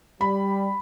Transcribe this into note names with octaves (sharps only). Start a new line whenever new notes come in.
G3 B5